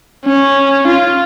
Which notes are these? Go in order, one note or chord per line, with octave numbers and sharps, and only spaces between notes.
C#4
F4